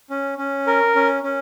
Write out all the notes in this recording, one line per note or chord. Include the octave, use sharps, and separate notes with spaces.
C#4
C#4
A#4
C#4
C#4